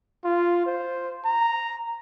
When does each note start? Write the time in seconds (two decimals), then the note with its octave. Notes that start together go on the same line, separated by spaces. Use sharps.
0.25 F4
0.66 C5
1.25 A#5